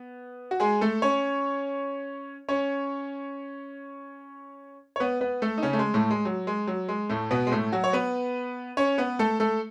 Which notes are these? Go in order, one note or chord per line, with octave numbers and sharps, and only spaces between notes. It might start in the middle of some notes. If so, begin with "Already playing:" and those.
Already playing: B3
F#4
G#3 G#4
A3 A4
C#4 C#5
C#4 C#5
C#5
B3 B4
B3 B4
A3 A4
D#4
C#3 C#4
A3
G#3
A2 A3
G#3
F#3
G#3
F#3
G#3
A2 A3
B2 B3
G#3
A2 A3
F#3 F#4
C#5
B3 B4
C#4 C#5
B3 B4
A3 A4
A3 A4